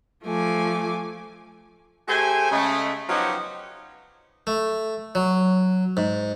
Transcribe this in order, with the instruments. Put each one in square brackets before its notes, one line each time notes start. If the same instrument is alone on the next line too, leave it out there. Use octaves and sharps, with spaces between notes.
[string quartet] F3 A3 G#5 D6
[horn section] A3 G4 G#4 C5 G#5
C#3 G#3 A3
F3 F#3 B3 D#4 F#4 G4
[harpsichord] A3
F#3
G#2